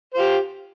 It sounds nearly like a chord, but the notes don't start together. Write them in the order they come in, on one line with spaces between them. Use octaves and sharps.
C5 F4 G4